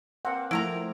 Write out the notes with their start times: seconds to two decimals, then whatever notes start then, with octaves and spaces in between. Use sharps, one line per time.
0.25 A#3 C4 F#5
0.51 F3 A3 E4 A#4 A#5